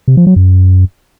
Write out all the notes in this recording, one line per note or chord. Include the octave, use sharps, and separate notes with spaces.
C3
F3
F#3
F#2